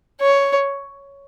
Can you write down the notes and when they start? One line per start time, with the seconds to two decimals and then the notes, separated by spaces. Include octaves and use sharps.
0.21 C#5